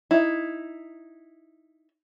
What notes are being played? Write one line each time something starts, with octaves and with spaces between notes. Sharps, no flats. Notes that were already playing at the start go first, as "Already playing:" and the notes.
D#4 E4